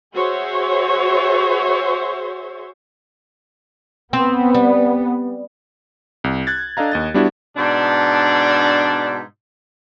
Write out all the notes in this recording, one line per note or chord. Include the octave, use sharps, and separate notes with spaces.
F#4 G#4 C5 C#5 E5
B3 C4
G3
C2
F#6 G#6 A6
D4 A4 D#5 F5 A#5
D#2 D#5 A6
G3 B3 D4 E4 F#4 G4
G#2 B2 D4